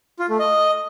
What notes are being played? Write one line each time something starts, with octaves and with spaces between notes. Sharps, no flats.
F4
A3
D#5